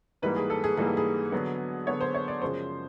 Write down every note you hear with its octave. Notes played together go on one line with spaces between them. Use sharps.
G#2 E3 G3 A#3 B4
G#4
A4
G#4
G#2 E3 G3 A#3 G#4
A4
G#4
D3 F#3 B3
D3 F#3 B3 C#5
C5
C#5
D5
F#2 C#3 F3 G#3 C5